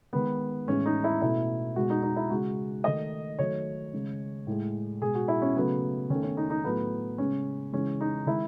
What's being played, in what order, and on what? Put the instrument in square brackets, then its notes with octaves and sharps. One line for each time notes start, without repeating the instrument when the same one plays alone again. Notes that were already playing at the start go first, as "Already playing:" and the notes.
[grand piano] D#3 G#3 B3
A2 E3 G#3 C#4
D#4
E4
B2 A3 E4
B2 G#3 F#4
D#4
D#4
E4
C#3 G#3 F#4
D#3 A3 D#5
D#3 F#3 A3 C#5
C#3 G#3
A2 G#3
B2 G#3 G#4
F#4
E4
C#4
C#3 F#3 A3 B3
D#3 A3 C#4
C#4
D#4
D#4
A2 F#3 A3 B3
C#3 G#3 C#4
C#3 E3 G#3 C#4
D#4
D#3 G#3 E4